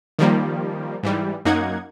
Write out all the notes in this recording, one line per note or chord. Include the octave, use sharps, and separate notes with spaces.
D#3 F3 G3 A#3
G#2 E3 G3
F#2 A#3 D#4 F#5 G#6